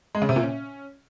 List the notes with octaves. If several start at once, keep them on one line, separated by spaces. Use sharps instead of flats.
G#3
C#3
C3
A#2
C#4